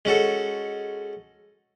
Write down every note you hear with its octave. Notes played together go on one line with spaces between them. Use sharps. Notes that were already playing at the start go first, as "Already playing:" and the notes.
G#3 C#4 F#4 A4